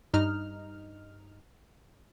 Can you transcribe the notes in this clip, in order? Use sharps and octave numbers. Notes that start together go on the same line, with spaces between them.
G2 D#4 F6